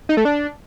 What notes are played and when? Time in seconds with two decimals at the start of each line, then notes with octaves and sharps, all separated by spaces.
0.09 D#4
0.17 A3
0.25 D4